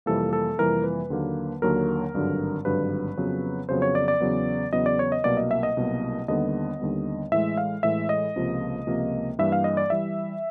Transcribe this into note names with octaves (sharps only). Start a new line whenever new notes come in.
F2 C3 E3 G3 A#3 A4
A4
F2 C3 E3 G3 A#3 A#4
B4
D#2 D3 F#3 A#3
D#2 D3 F#3 A#3 A#4
G#1 G2 D3 F#3
G#1 G2 D3 F#3 B4
F2 C#3 F#3 B3
F2 C#3 F#3 B3 C5
C#5
D5
D5
E2 C#3 F#3 B3
E2 C#3 F#3 B3 D#5
D5
C#5
D#5
C2 B2 F#3 A#3 D5
D#5
E5
D#5
C2 B2 F#3 A#3
D#2 D3 G3 B3 D#5
D#2 D3 G3 B3
A2 E3 G#3 E5
F5
A2 E3 G#3 E5
D#5
C#2 C3 F3 A#3
C#2 C3 F3 A#3
G2 E3 G3 A#3 E5
F5
D#5
D5
E3 G3 E5